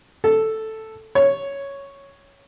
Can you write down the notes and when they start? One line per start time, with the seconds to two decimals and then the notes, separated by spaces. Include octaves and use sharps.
0.24 A4
1.15 C#5